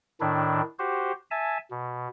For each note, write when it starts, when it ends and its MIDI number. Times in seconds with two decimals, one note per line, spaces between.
0.21 0.62 45
0.21 0.62 51
0.21 0.62 62
0.21 0.62 64
0.79 1.12 66
0.79 1.12 67
0.79 1.12 72
1.31 1.58 76
1.31 1.58 80
1.31 1.58 81
1.71 2.08 47